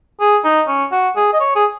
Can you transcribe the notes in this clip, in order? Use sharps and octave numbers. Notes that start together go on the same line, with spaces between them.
G#4
D#4
C#4
F#4
G#4
D#5
C#5
G#4